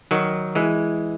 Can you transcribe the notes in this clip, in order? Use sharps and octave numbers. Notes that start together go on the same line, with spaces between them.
D#3 F#3
E3 G#3